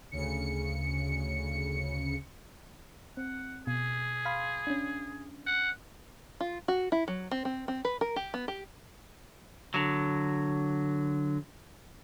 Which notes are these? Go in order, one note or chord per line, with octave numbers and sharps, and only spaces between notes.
D2 C#3 C#7
C4 F#5
B2 G#4
F5 B5 C6
C#4 D4
F#5
F4
F#4
E4
F#3
C4
C4
C4
B4
A#4
G4
B3
G4
D3 F#3